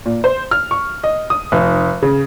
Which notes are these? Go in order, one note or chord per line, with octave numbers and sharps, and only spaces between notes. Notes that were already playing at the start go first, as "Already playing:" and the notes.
A#2
C5
F6
C#6
D#5
D#6
F1
C#3